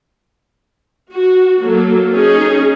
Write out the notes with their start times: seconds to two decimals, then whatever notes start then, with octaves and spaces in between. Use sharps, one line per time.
1.13 F#4
1.62 F#3 A#3 A4
2.12 C#4 D#4 G#4